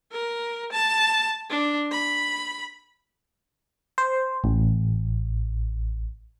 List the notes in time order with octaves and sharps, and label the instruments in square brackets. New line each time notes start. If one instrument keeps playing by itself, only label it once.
[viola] A#4
A5
D4
B5
[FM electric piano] C5
A1